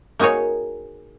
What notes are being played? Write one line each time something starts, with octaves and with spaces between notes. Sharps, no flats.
A#3 D#4 F#4 G#4 C#5